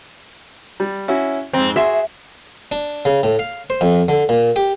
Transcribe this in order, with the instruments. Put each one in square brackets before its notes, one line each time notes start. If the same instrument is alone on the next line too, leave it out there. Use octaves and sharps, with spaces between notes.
[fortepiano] G3
C#4 E4 F#4
[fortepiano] F2 G#2 [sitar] C4
[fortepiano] F#4 G#4 C6 [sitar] E5
[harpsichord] D4
C#3
A2
F5
C5
F2
D3
A#2
G4